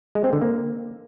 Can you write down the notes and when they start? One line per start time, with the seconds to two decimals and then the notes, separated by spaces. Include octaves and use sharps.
0.15 G#3
0.24 C4
0.33 D3
0.42 A#3